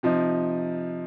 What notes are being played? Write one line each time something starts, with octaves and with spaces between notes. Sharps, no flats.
C3 F3 D#4